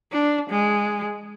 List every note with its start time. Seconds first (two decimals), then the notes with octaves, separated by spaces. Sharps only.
0.12 D4
0.50 G#3